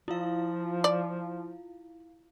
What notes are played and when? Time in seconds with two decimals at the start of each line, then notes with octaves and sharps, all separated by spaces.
0.08 F3 E4 F4 F5
0.84 D5